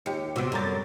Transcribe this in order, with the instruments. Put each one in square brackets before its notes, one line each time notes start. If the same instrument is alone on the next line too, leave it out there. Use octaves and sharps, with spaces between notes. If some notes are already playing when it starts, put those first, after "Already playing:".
[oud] D#2 [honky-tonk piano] G4 C#7
[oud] C3 B3 [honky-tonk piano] F#4 E6 D7
[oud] F#2 G3 [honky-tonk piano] A4 A#5 A6